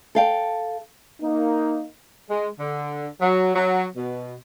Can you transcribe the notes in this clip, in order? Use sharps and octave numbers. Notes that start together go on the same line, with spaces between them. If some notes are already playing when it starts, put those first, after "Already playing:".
A4 F5 G5
A#3 D#4
G#3
D3
F#3
F#3
B2